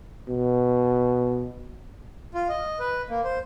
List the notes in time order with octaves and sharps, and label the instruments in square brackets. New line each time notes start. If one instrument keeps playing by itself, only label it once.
[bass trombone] B2
[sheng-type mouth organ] F4
D#5
B4
A#3
C5